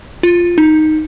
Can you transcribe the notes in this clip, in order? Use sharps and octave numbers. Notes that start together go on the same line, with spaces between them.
F4
D#4